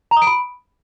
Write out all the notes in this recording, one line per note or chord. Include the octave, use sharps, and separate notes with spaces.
A#5
D#6
D7
B5